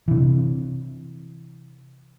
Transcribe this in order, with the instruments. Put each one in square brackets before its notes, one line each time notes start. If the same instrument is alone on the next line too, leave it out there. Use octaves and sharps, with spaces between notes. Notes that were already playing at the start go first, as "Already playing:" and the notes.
[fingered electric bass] C3 E3